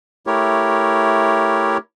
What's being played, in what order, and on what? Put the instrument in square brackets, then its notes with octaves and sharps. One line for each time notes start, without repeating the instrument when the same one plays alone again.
[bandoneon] A3 E4 G4 A#4 C#5